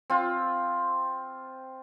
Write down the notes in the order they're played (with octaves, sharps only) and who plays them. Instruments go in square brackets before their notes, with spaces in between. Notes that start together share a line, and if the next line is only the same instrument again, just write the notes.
[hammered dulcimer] C4 F4